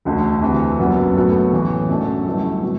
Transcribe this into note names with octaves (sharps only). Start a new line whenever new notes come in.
E1 D2 D3 A3
D2 C3 E3
F#1 F#2 F#3 B3 D4
A2 F#3 B3 F#4 A4
A1 A2 E3
F#2 F#3 A3 D4
G1 G2 F#3 A3 E4
B2 A3